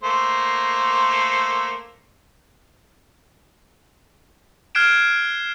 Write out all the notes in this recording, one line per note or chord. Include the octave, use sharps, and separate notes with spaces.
A3 A#3 C5
F6 F#6 G#6 C7 D7 E7